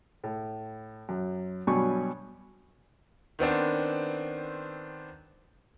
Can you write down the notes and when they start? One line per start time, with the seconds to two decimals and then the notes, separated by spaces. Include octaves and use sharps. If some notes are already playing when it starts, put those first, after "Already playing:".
0.24 A2
1.09 F#2
1.67 G2 B2 F#3 G#5 A5 C#6
3.39 D#3 B3 C4 D4